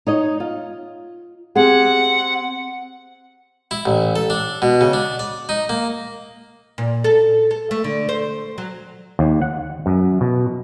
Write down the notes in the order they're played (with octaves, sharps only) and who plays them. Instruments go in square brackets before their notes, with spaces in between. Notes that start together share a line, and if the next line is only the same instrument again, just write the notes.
[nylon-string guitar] D#4 C#5 D#5
F4
[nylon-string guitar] C4 G4 G#4 [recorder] F#5
[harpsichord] E4
A1
A4
D4
B2
C#3
D4
D5
D#4
A#3
[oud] A#2
A4
A4
A3
D3
C5
F#3
[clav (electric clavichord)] D#2
F#5
F#2
B2